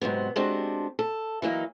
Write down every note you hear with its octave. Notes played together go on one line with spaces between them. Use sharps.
G#2 C3 F#3 B3
G#3 B3 C4 D4 F#4 G4
A4
E3 F#3 A#3 D#4